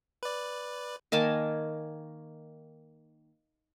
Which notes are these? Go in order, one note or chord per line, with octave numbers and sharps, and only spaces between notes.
B4 D5
D#3 A#3 G#5 A5